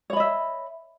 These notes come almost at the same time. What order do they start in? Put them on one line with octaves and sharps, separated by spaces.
C#5 B5 D#5 E5